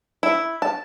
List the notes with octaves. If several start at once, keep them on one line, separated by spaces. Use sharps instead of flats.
E4
A5